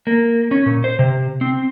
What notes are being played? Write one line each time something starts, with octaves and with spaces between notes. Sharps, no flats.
A#3
C#4
A#2
C5
C3
C4